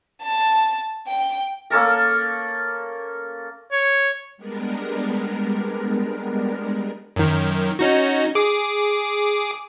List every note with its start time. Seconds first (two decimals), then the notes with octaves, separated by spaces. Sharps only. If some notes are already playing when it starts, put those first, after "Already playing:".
0.22 A5
1.07 G5
1.70 A#3 C#4 A4 A#4
3.72 C#5
4.37 G3 G#3 B3 D4 A#4
7.16 F#2 D#3
7.79 C#4 D#4 F#4
8.35 G#4 D6